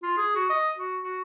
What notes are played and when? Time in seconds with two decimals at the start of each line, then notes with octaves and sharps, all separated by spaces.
0.03 F4
0.17 G#4
0.36 F#4
0.50 D#5
0.78 F#4
1.03 F#4